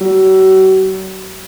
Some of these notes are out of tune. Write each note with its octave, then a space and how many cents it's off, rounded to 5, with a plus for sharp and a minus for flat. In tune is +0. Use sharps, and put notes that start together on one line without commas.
F#3 +40